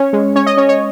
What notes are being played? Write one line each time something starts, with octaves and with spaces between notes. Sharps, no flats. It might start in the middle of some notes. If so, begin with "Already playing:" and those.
Already playing: C#4 C#5
G#3
C#4 C#5
D#5
C#4 C#5
C#5